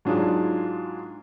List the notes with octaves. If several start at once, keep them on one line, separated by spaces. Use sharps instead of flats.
G#2 F#3 D4 F4 G#4